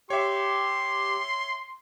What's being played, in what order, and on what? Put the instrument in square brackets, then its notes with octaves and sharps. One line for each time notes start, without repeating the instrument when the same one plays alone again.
[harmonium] G4 [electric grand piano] C#5 E5 [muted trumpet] C6